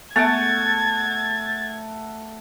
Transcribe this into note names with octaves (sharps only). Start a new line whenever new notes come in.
A3 B3 A4 E5 F#5 G#6 A6